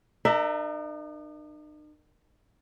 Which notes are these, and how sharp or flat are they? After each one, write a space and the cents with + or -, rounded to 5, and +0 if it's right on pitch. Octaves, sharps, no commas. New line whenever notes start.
D#4 -45 A#4 -5 E5 +10